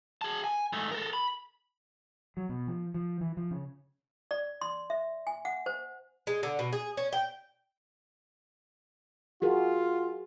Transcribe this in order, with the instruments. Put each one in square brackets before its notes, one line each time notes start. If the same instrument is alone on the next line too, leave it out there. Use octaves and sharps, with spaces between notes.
[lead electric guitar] G#4 A5
G#5
G#2 A3
A4 A#4
B5
[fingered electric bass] F#3
B2
F3
F3
E3
F3
C#3
[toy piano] D5
C6
E5
G#5
F#5
C5
[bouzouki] G#3
D3
B2
G#4
C#4
G5
[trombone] F4 [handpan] F#4 G#4 A#4